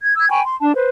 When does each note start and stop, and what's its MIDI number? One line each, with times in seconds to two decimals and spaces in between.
0.01 0.13 92
0.17 0.27 88
0.17 0.27 92
0.29 0.42 79
0.29 0.42 80
0.29 0.42 83
0.29 0.42 85
0.42 0.54 84
0.60 0.72 62
0.60 0.72 81
0.75 0.89 71
0.75 0.89 72